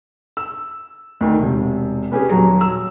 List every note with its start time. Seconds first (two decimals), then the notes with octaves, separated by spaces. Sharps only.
0.37 E6
1.21 D2 D#3
1.40 E1 C3
2.12 B3 C#4 G4 G#4
2.29 D#1 F#3 A#5
2.61 E6